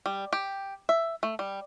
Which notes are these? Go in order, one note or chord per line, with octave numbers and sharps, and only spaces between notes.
G3
G4
E5
A3
G3